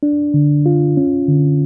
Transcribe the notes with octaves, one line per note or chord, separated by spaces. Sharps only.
D4
D3
F4
C#4
D3